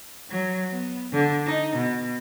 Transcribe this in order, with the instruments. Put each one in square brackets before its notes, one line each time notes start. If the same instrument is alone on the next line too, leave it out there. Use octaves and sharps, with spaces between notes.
[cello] F#3
B3
D3
D#4
B2